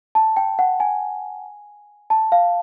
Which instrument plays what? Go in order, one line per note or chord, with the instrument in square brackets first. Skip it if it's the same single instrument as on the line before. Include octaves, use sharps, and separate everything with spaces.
[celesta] A5
G5
F#5
G#5
A5
F5